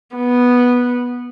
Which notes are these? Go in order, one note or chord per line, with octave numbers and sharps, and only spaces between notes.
B3